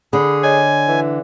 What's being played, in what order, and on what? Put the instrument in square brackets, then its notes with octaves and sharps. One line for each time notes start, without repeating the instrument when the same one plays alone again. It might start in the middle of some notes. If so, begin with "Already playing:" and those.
[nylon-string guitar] D3 [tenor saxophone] G#4 [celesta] B5
[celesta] C#5 D#5 [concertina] G#5
[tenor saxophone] E3